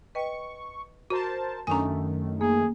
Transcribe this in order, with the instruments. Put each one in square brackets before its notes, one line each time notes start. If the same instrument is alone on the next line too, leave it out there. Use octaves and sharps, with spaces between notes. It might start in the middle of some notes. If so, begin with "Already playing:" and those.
[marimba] B4 D#5 G5 [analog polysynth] C#6
[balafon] F#4 [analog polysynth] A#4 C5 A5
[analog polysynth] F#2 D#3 A3 [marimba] C#4 D4 D#6 [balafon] G#5 A#5
[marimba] A#3 [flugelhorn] G#4